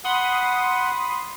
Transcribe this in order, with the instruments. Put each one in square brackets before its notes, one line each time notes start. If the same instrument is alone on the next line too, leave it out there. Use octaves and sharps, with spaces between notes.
[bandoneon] F#5 [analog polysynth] B5 C6 D#6